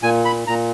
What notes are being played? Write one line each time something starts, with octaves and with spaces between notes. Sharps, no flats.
A#2 G#5
B5
A#2 A#5